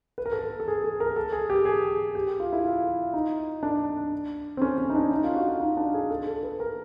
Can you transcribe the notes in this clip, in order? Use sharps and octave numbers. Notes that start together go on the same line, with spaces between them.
B4
A#4
A4
A#4
A4
G#4
G#4
A#4
A4
G#4
G4
G#4
G4
G4
F4
E4
F4
D#4
D4
C4
C#4
C#4
D#4
D4
D#4
F4
F#4
F4
D#4
D4
G#4
A4
A4
B4
A#4